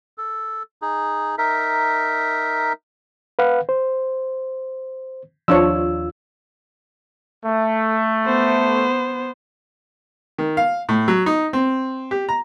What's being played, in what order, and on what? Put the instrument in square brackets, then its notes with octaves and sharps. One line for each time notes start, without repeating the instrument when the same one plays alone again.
[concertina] A4
D#4 G#4
D#4 A#4 E5
[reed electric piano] B4 F5 F#5
C5
[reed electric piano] D#2 F4 E6 [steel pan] F3 D4 C#5
[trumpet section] A3
[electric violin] B3 C5
[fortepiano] D#3
F5
A2
F#3
D#4
C4
G4
A#5